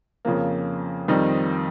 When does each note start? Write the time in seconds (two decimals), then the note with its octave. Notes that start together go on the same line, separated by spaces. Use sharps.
0.25 F2 C#3 F3 A#3
1.08 F2 D#3 G3 C4 D#4